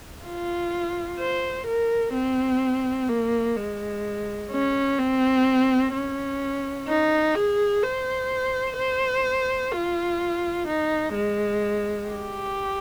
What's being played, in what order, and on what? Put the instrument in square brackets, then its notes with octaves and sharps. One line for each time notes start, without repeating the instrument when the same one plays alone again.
[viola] F4
C5
A#4
C4
A#3
G#3
C#4
C4
C#4
D#4
G#4
C5
C5
F4
D#4
G#3
G4